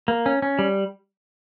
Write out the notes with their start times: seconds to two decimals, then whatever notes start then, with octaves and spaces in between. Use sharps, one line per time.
0.08 A#3
0.26 C#4
0.42 C#4
0.59 G3